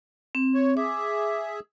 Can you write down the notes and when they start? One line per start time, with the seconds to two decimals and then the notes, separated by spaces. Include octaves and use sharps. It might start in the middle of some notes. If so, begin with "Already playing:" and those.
0.35 C4
0.54 C#5
0.77 G#4 E5 D6